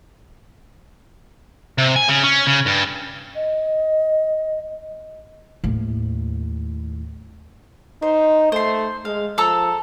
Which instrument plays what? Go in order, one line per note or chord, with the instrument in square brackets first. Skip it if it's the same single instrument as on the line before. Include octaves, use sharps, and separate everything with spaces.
[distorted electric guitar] C3
G#5
C#3
C#4
C#3
G2
[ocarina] D#5
[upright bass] D#2 A2
[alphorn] D#4 [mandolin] C5
[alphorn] A3 [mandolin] C5 C6
[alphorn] G#3 [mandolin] F5
[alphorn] F3 [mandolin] A4 A#5 E6